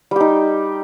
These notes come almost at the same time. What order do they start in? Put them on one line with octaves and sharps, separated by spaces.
G3 G4 D#4